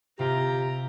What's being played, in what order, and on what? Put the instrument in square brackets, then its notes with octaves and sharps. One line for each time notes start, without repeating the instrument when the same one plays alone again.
[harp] C3 F4 [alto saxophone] G4 [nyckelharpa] A#5